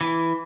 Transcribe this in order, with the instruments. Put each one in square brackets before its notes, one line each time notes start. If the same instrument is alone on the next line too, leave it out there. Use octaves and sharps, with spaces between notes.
[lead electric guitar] E3